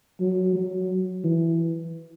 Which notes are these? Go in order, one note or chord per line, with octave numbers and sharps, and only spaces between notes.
F#3
F#3
E3